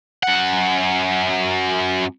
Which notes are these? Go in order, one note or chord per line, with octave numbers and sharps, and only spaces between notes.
F#2 F#5